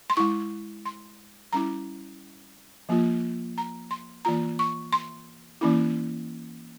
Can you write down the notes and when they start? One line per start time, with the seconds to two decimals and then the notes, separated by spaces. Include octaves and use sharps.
0.10 C6
0.17 G#3 E4 C#6
0.85 C6
1.53 G3 C#4 E4 A#5
2.89 F3 A#3 F4
3.58 A#5
3.91 C6
4.25 E3 A#3 F4 A#5
4.59 C#6
4.93 C6
5.61 E3 A#3 C#4 E4